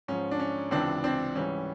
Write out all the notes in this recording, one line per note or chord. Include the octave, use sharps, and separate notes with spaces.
G#2 F3 C#4
D4
C#4
C#2 C3 E3 C4 D4
C4 D4
G#2 E3 G3 C#4